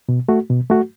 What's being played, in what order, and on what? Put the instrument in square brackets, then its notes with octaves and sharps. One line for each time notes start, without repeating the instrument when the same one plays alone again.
[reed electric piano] B2
A3 F#4
B2
A3 F#4